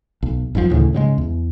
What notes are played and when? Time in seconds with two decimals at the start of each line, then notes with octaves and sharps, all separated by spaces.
0.23 B1
0.55 G#1 F#2 D#3 F3
0.70 D2 A2 C#3 E3
0.93 G#2 C#3 F3 G#3
1.18 E2